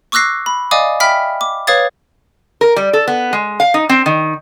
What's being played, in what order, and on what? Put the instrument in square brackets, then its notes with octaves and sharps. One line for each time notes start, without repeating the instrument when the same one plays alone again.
[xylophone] C#6 D6 E6 F#6 A#6 C7
B5
D5 D#5 F5 G#5 D6 D#6
E5 G5 B5 F6 B6
D6
B4 C#5 F5 D#6 G#6 A6
[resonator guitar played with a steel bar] A#4
G3
A4
B3
G#3
F5
D#4
C4
D#3